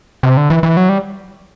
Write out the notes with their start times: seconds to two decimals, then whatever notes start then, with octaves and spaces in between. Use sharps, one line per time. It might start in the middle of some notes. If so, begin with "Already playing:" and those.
0.23 C3
0.37 D3
0.50 E3
0.63 E3
0.77 F#3
0.89 G3